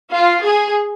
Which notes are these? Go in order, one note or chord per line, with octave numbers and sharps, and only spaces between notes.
F4
G#4